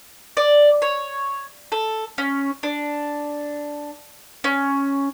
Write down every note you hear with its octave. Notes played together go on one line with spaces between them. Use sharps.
D5
C#5
A4
C#4
D4
C#4